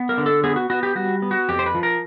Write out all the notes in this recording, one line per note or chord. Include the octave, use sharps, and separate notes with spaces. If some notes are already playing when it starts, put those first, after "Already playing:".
Already playing: B3
A#4
D3
A4
B3 G#4
F#4
B3 F#4
G4
G3 F#4
B3
F#4
F2 G4
C5
B4
F3
A#4